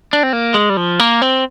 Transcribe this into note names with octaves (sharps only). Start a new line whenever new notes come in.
D4
C4
A#3
G#3
G3
F3
A#3
C4